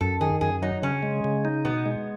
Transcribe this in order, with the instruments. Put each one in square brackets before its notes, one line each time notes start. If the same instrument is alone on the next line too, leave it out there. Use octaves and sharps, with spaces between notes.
[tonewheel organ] F#2 [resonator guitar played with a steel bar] A4
[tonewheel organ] D#3 [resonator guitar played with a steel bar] G#4
[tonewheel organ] F#2 [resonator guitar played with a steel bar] G#4
[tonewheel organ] F#3 [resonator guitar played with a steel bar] D#4
[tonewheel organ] C#3 [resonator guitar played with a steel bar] C#4
[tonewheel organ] G#3
C#3
D#4
[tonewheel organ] B2 [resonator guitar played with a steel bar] B3
[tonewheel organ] G#3